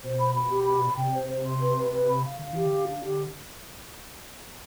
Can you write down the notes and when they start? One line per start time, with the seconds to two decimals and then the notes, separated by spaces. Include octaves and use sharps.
0.04 B2 C5
0.19 B5
0.35 B5
0.50 G4
0.66 B5
0.82 D5
0.97 C3 G5
1.14 C5
1.29 C5
1.45 C6
1.60 B4
1.76 B4
1.92 B4
2.09 B5
2.24 F5
2.39 D3 F5
2.53 E3 G4
2.66 D3
2.71 F5
2.86 D4
3.02 G4